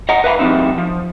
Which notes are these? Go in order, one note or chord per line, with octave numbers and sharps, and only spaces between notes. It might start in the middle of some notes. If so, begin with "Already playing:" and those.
D#5 F#5 A#5
B4 E5 F5 G#5 B5
F3 G3 C4 D#4 E4
F3